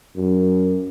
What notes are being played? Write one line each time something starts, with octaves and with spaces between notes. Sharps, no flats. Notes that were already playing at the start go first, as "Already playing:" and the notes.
F#2